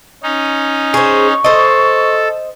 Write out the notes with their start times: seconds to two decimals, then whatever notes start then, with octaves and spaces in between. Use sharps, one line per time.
0.23 C#4 D#4
0.94 G#4 C5 C#6
1.44 A4 C5 D#5